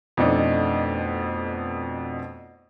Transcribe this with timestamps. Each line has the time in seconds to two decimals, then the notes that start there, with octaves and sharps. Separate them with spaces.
0.17 F2 B2 A3 D4 D#4